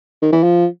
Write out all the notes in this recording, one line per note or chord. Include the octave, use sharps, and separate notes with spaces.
D#3
E3
F3